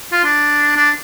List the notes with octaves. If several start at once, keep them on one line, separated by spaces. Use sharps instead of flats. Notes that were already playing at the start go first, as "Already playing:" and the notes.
F4
D4
D4